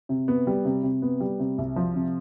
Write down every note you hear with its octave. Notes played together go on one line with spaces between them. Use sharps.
C3
B3
G3
C3
C3
B3
G3
C3
C2
F3
C3